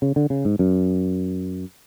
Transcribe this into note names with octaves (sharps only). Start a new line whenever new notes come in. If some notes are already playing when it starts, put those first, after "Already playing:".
C#3
D3
C#3
G#2
F#2